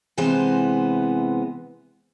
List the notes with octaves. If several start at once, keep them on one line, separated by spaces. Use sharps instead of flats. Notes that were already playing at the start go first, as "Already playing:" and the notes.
C3 E3 G#3 B3 C5 A5